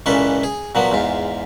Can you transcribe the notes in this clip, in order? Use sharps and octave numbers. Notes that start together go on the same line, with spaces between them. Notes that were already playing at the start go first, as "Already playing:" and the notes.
C#2 A#2 E3 C#4 A4 B4
G#4
A#2 F3 F#3 B3
E2 G#2 F4